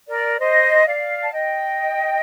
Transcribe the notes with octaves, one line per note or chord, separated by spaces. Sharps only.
A#4 D5
C5 D#5
D5 F5
A5
D#5 G5